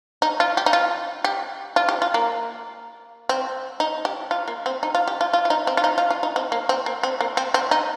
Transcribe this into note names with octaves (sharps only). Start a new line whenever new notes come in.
D#4
F4
G4
D#4
F4
G4
F4
G4
F4
A#3
C4
D#4
G4
F4
A#3
C4
D#4
F4
G4
F4
F4
F4
D#4
C4
F4
D#4
F4
F4
D#4
C4
A#3
C4
A#3
C4
A#3
C4
C4
D#4